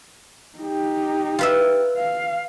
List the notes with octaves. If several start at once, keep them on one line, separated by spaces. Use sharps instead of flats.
D#4 G4
F4 B4 E5
F5